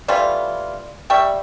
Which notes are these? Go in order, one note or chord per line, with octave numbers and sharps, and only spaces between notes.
E3 G3 A3 F4
G3 E5 G5 C#6